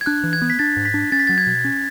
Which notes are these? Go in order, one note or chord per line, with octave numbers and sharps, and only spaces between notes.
G#6
D4 F#6
E3
G#6
B3
B6
D4 A6
G#2
B6
D4
C#4 A6
B6
F#3 A6
G#6
B2
C#4